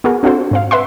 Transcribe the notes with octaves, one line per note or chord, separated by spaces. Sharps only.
B3 F#4 G#4 A#4
C4 D4 F4 F#4 A4 C5
G#2 C4 F5
B4 E5 F#5 C6